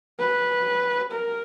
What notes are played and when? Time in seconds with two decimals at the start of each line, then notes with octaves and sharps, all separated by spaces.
0.19 B4
1.11 A#4